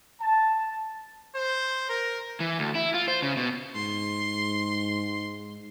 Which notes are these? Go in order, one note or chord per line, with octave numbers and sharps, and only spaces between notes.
A5
C5
A#4
E3
D2
E4
F4
C5
C#3
B2
G#2 C6